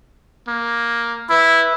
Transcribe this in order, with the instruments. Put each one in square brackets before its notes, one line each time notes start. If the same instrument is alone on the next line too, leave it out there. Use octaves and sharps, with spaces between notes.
[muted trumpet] A#3
[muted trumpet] E4 [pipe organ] B4 E5